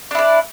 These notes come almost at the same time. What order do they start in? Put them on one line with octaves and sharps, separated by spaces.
D4 E4 D5